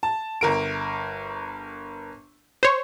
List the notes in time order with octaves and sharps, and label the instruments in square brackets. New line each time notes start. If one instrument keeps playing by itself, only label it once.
[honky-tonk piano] A5
G1 A#4 D7
[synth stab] C5 C#5